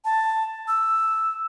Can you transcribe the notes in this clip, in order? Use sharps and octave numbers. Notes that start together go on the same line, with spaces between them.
A5
E6